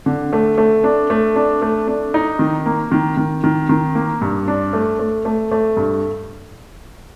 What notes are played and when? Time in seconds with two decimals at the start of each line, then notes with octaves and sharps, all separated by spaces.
0.06 D3
0.33 A3
0.58 A3
0.84 D4
1.10 A3
1.36 D4
1.62 A3
1.87 D4
2.14 D#4
2.39 D#3
2.66 A#3
2.92 D#3
3.17 D#3
3.44 D#3
3.69 D#3
3.95 A#3
4.21 G2
4.48 D4
4.73 A3
4.99 A3
5.25 A3
5.52 A3
5.77 G2